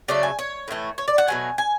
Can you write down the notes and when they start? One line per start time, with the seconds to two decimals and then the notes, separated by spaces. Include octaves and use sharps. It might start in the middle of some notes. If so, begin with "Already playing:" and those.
0.08 C#3 F#3 A3 D5
0.23 G#5
0.39 C#5
0.68 A2 E3 A3
0.98 C#5
1.08 D5
1.18 F#5
1.27 B2 F#3 A3 G#5
1.58 G#5